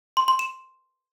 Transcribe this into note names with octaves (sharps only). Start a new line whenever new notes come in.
C6
C6
E7